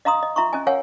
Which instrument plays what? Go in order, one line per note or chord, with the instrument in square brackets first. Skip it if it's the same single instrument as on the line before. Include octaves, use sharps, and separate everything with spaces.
[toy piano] D#5 F5 A#5 C6 D#6
D#5
F4 E5 A#5 C6 C#6
C#4 D#5 G#5
A#4 C#5 F5 F#5 G#5